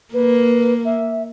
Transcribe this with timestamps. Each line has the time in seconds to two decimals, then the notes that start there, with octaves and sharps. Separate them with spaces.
0.14 A#3 B4
0.85 E5